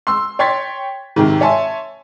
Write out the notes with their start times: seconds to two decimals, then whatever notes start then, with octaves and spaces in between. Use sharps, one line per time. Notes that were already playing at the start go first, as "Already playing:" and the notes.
0.07 C6 E6
0.39 C#5 G5 C6 G#6 A6 B6
1.16 G#2 C3 D#3
1.41 C#5 E5 G#5 A5 C6